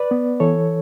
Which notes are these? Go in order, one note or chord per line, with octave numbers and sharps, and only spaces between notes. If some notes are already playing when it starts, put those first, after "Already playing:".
Already playing: B4 D5
B3
E3 A4 C#5